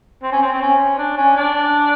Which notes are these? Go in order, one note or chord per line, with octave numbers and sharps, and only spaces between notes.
C4
C#4
C4
C4
C#4
D4
C#4
D4